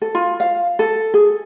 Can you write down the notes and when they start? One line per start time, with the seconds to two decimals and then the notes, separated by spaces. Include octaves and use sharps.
0.02 A4
0.15 F4
0.40 F5
0.79 A4
1.14 G#4